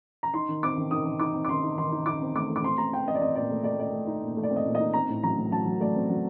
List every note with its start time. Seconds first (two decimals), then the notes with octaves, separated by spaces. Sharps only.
0.23 A#5
0.34 D#4 C6
0.49 D#3
0.63 C4 D6
0.78 D#3
0.91 D#3 D#6
1.05 D#3
1.20 D#4 D6
1.35 C4
1.45 D6
1.49 D#3 C6
1.64 D#4
1.78 D#3 C6
1.92 D#4
2.06 D#4 D6
2.21 C4
2.35 A3 D6
2.50 A3
2.56 D6
2.63 C4 C6
2.78 A3 A#5
2.93 C4 G5
3.07 C4 D#5
3.15 D5
3.21 C4 D#5
3.36 A#2 D5
3.51 A3
3.64 A3 D5
3.79 A3 D5
3.93 A3
4.07 D#4
4.22 A#2
4.37 A3
4.43 D5
4.51 C4
4.56 D#5
4.66 A#2
4.75 D#5
4.80 D#4
4.94 C4 A#5
5.09 A2
5.23 F#3 A#5
5.37 A2
5.51 F#3 A5
5.66 F#3
5.80 A3 D5
5.95 C4
6.10 F#3